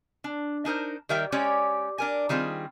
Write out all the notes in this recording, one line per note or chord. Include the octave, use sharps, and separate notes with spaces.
D4
D4 D#4 A#4 C5
D#3 G3 A#4 E5 G5
G#3 C#4 G4 C#5 D5
D4 A#4 G#5
D#3 G3 C4 F4 G#4